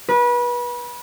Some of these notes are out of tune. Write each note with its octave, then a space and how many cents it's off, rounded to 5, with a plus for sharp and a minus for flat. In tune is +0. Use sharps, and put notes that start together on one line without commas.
B4 -30